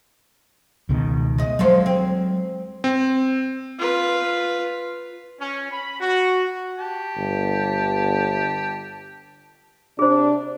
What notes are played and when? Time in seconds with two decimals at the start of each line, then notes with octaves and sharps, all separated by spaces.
0.89 C#2 B2 D#3
1.38 G#3 D#5
1.59 D3 F3 F#3 G#3 C5
1.86 C4
2.84 C4
3.78 F4 B4
5.39 C#4
5.72 B5
6.00 F#4
6.77 G4 A5
7.17 G1
9.99 C3 D4 G#4 C5